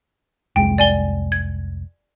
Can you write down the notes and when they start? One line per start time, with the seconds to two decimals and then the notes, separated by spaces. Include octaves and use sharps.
0.56 F1 C2 G#3 G5
0.78 D5 G#5 G7
1.32 G#6